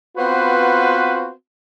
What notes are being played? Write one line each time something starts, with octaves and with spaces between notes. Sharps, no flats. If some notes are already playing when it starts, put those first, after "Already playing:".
B3 C4 F4 F#4 B4 C5